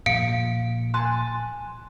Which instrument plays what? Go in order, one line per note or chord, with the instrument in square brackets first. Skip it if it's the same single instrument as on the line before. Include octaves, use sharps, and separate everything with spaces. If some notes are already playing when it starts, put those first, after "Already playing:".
[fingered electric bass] A#2 F3 [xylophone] F5 C#7 D7
[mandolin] G#5 A5 F#6 [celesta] C6